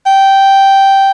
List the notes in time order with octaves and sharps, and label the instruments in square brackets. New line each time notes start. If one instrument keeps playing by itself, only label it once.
[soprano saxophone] G5